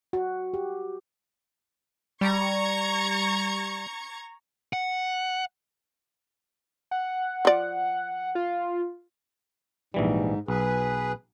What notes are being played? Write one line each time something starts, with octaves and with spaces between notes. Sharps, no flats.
F#4
G4
G3 A#5 C#6 G#6
F#5
F#5
F3 D5
F4
A#1 G#2 E3 G3
B1 G#4 B4